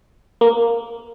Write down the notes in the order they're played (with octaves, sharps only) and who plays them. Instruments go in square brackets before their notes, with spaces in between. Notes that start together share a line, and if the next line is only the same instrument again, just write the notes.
[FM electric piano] A#3